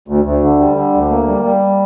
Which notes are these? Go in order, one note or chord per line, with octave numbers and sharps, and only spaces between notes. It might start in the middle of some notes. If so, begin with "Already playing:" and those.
D2
D2
D3
G3
D3
D2
A#3
G3
G3